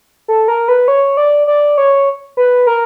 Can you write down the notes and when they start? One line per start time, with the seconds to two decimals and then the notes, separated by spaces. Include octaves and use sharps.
0.28 A4
0.48 A#4
0.68 B4
0.88 C#5
1.17 D5
1.47 D5
1.78 C#5
2.37 B4
2.67 A#4